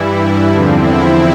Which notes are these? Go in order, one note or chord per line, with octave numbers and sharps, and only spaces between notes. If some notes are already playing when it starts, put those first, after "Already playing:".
Already playing: G2 E3 G3 E4
E2 D3 F3 C4 D4
E4